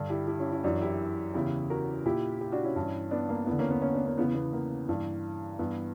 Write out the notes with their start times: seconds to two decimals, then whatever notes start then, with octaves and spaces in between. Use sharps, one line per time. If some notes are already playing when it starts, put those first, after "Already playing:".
Already playing: G2 D3
0.10 E4 G4
0.28 E4 G4
0.40 C#4 E4
0.52 C#4 E4
0.64 F#2 E3 D4 F#4
0.81 E4 G4
1.34 E2 C#3 E3 E4 G4
1.70 F#4 A#4
2.06 A#2 E4 G4
2.40 E4 G4
2.52 D4 F#4
2.64 C#4 E4
2.76 G2 E3
3.11 B3 D4
3.29 A#3
3.46 E2 D3 B3
3.59 A#3 C#4
3.71 B3
3.82 A#3 C#4
3.94 B3 D4
4.05 A#3 C#4
4.17 E2 C#3 E3 B3
4.35 B3
4.53 A#3
4.89 G2 E3
5.59 G2 E3 B3